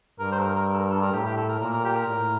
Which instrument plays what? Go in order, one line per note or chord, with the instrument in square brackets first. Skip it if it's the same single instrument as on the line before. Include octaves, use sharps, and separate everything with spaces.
[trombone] G2 [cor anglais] A#4
[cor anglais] C5
A4
A#4
A#4
A4
A#4
A4
A#4
[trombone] A2 [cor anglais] G4
[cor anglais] G4
A4
A#4
[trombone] A#2 [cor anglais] A#4
[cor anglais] A#4
G4
A#4
[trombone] A2